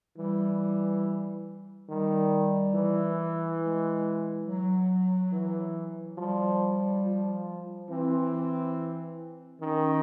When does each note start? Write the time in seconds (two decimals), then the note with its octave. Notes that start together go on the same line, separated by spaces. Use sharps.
0.18 E3 G3
1.89 D#3 G3
2.75 E3
3.61 G#3
4.46 F#3
5.33 E3
6.18 F3 G3
7.03 F3
7.89 E3 C4
9.61 D#3 C#4